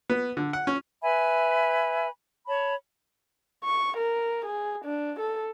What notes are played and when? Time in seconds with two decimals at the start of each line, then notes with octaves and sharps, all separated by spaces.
0.10 B3
0.37 D3
0.53 F#5
0.67 C#4
1.02 B4 E5 G#5 B5
2.46 C#5 A5 B5
3.64 C#6
3.97 A#4
4.46 G#4
4.85 D4
5.20 A4